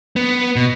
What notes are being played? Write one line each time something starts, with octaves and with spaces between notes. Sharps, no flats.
B3
B2